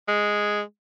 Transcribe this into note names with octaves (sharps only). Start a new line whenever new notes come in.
G#3